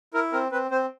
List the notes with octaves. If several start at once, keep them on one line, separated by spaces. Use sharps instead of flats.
E4 A#4
C4 A#4
C4 B4
C4 C5